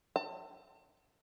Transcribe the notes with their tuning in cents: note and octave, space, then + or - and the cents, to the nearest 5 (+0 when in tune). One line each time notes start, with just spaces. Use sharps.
A5 +35